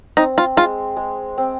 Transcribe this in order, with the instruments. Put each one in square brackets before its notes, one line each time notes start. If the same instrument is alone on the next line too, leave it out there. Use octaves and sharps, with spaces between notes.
[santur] C4 [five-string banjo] D#4
[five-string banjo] F4
[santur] G#3 [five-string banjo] F4
[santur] G#3
C4